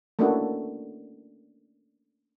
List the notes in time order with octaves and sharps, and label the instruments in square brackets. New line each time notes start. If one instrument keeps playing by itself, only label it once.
[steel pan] A3 A#3 C#4 D4 E4 F#4